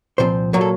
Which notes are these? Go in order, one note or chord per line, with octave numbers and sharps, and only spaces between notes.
C2 A#2 F3 C4 C5
A#2 F#3 A#3 F#4
A4